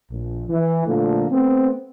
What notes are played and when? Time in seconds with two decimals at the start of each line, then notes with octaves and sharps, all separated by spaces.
0.11 A#1
0.49 E3
0.87 A#2 D3 F3 A3 A#3
1.31 A3 B3 C4